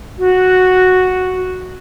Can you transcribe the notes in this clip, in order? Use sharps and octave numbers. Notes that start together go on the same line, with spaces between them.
F#4